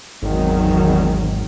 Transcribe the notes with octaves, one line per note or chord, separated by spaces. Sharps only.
G#1 E2 D#3 F#3